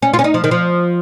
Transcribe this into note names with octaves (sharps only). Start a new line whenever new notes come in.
C#4
F4
C#4
D#4
F3
D#3
F3